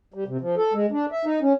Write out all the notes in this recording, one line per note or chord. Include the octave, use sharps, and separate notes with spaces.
G3
C3
F3
A4
G#3
D4
E5
D#4
C#4